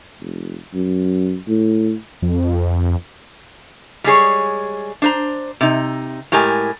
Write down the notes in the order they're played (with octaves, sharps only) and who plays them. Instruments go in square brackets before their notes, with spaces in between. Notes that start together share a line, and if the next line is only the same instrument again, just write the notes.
[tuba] F1
F#2
A2
[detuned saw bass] F2
[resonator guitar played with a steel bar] G3 G#3 G#4 C#5
D4 C5 A#5
C3 D#4
A2 G#3 G4 A#4 G#5